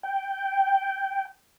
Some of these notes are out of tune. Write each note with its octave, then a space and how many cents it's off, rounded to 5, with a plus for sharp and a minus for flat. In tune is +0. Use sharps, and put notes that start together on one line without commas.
G5 -10